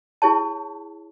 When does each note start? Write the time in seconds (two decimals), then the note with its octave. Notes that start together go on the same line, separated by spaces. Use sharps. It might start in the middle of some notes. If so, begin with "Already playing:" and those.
0.22 E4 G#4 C#5 A5